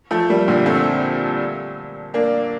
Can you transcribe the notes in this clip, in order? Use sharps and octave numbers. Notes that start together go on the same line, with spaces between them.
F3 A3
G3 A#3
A#2 D3
A3 C4
A#3 D4